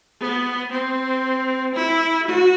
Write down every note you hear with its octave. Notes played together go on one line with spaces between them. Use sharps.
B3
C4
E4
F#4